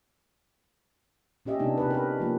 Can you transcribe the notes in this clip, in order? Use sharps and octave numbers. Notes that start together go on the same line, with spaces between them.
A#2 C#4 G4 D#5 E5
C3 B3 D4 D#4
C3 G4 B4
A#4 B4
F3 A#3